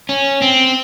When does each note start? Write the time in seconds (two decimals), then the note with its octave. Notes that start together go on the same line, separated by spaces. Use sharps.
0.09 C#4
0.42 C4